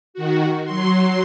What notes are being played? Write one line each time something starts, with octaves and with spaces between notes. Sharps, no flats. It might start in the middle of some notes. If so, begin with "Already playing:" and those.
D#3 F#4
F#3 C6